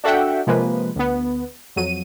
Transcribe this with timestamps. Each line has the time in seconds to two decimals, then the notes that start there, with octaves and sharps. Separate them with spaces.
0.04 D4 F#4 A4 E5 F#5 G5
0.47 C3 F3 G#3 A#3 B4
0.96 D2 B3
1.76 F2 F#3 D#7